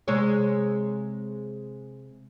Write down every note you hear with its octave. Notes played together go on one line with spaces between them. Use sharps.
C3 G#3 C#5